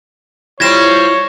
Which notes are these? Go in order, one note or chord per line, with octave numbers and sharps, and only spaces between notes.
G3 C4 E4 F4 C#5 G#6 A#6 E7